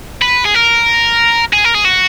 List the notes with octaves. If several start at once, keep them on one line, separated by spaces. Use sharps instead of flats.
B4
G#4
A#4
G#4
A#4
G#4
F#4